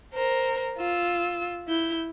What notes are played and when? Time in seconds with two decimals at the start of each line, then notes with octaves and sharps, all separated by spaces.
0.13 A#4 C5
0.78 F4 E6
1.68 E4 G6